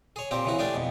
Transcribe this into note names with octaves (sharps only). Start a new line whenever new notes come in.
G#4 C#5
A#2 C4 G4
C#3 E3 F#4
A3 D4 G4 G#4
F2 B2